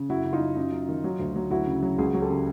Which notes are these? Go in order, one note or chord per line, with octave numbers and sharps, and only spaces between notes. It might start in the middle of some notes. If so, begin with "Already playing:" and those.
Already playing: C#3
F#2 E4 F#4
C#3
D#4 F4
F#2
F#2
F#2
D#3
F#3
D2
F#3
D2 E4 F#4
C#3
F#3
C#2 F#4 G#4
F#3
G4 A4
C#3